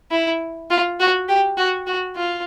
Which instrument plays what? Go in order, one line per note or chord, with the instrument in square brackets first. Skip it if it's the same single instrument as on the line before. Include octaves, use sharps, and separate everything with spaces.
[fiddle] E4
F4
F#4
G4
F#4
F#4
F4